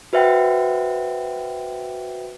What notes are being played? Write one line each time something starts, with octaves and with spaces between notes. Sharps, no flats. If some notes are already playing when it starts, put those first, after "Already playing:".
F#4 B4 C5 E5 F#5 G5